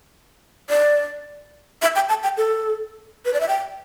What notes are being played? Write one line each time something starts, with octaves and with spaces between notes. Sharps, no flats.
D5
E5
G5
A5
G5
A4
B4
D5
E5
G5